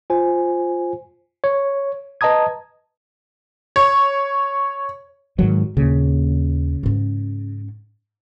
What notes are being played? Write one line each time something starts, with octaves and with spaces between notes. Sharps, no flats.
F4 C5 G#5
C#5
B4 D#5 A5 A#5 D#6 G#6
C#5
G#2 D#3 F#3 G#3
D#2 A#2 C#3
G#2 C#4